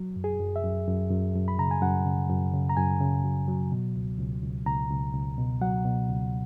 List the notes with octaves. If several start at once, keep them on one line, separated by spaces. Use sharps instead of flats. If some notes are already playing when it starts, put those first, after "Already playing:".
Already playing: F#3
F#2
G#4
F#2
E5
F#2
F#2
F#2
F#2
B5
C#3 A#5
G#5
F#2 F#5
C#3
F#2
C#3
A#5
F#2 G#5
C#3
F#3
F#3
B2
C#2
C#2
C#2
C#2 A#5
C#2
C#2
B2
F#3 F#5
B2
C#2